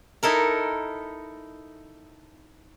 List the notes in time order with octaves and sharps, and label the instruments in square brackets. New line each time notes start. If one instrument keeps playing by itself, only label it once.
[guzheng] D#4 E4 A4 A#4